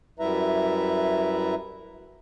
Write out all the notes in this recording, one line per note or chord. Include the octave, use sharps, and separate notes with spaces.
F#2 G3 E4 B4 E5 A#5